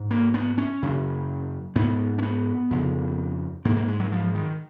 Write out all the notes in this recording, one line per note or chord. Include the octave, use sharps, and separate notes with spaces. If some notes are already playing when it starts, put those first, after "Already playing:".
Already playing: G#2
A#3
B3
C#4
F#2 C#3
G#2 B3
C#4
B3
F2 C#3
G#2 A#3
A#3
G#3
F#3
F3
D#3